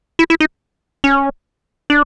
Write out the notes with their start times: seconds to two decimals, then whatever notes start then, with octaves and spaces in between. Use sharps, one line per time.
0.19 E4
0.30 E4
0.40 D#4
1.04 C#4
1.90 D4